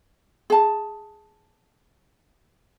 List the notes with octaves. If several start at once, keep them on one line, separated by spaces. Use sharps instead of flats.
G#4 A5